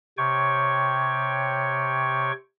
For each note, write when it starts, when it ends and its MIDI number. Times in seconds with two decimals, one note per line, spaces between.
0.18 2.32 48
0.18 2.32 73
0.18 2.32 79
0.18 2.32 85